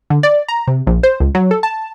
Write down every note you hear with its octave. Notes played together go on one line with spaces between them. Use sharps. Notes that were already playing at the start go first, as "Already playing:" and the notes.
D3
D5
A#5
C3
A#1
C5
C#2
F#3
A4
A5